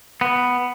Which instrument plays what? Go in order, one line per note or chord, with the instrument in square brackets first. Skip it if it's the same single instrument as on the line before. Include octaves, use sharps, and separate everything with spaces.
[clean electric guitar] B3